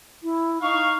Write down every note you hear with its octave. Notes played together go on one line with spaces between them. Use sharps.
E4
D#4 F5 C#6